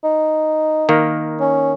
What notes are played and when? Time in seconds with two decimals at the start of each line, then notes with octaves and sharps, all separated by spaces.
0.03 D#4
0.89 D#3 A#3
1.40 C#4